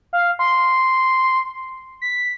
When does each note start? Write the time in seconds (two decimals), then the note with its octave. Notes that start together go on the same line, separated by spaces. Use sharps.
0.13 F5
0.39 C6
2.02 B6